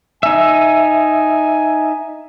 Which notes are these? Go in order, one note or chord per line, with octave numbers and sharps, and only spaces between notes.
D#4 E5 G#5